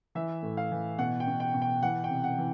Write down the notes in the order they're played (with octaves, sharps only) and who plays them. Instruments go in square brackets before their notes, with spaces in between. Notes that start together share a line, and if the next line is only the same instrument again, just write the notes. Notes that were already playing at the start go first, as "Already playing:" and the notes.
[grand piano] E3 E5
A2
F5
E3
B2 F#5
G5
B2
G5
B2
G5
E3 F#5
G5
C3
F#5
E3